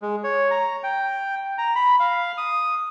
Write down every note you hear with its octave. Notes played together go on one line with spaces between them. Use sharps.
G#3
C#5
A#5
G5
A#5
B5
F5
D#6